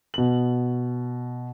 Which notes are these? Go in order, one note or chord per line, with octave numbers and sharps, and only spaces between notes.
B2 F#7